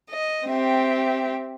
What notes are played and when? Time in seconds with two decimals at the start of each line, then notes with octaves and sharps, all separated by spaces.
0.11 D#5
0.47 C4 G4 E5